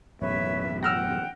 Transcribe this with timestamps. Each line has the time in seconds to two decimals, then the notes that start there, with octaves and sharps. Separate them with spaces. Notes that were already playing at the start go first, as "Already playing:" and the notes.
0.22 A1 F#2 B2 B4 C#5 E5
0.83 F#5 G5 E6 F6 A#6